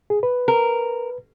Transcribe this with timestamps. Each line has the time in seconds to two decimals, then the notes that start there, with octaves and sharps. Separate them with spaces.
0.10 G#4
0.23 B4
0.48 A#4